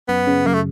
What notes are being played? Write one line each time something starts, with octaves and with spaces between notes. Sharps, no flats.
F#2 B3
C#3
F#2 A#3
A3